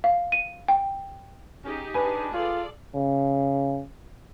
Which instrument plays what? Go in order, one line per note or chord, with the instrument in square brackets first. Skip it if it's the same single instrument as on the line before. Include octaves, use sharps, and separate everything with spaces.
[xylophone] F5
D#7
G5
[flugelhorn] C#4 [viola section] D#4 G4 G#4
[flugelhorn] D4 [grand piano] B4 G#5
[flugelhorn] F4 [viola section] G#4 A4 D5
[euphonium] C#3